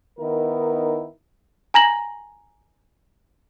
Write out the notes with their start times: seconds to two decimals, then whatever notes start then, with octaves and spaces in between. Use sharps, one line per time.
0.19 D#3 B3 D#4 E4 A#4
1.74 G#5 A#5 A#6 F#7